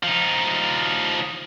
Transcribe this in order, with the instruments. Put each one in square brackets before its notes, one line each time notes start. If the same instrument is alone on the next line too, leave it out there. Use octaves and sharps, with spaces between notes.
[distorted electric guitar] F3 D#4